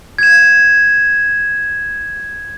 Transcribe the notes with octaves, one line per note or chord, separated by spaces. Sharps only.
G#6 E7